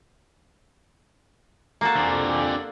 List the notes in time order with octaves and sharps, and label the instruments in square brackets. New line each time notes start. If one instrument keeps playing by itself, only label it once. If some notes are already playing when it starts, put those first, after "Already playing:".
[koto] A#3 F#4 A4
[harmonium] F2 G4 G#5 [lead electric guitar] D4 C5